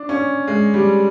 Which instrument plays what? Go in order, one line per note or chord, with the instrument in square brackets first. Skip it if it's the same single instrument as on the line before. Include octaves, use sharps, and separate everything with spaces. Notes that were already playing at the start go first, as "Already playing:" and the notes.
Already playing: [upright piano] D4
C#4
G#3
G3